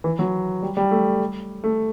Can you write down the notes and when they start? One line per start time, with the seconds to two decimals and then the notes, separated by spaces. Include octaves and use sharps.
0.04 E3
0.19 F#3
0.62 G3
0.77 G3
0.91 A3
1.64 A3